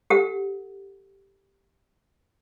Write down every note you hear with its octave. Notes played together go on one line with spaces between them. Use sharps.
G4 A4 F#5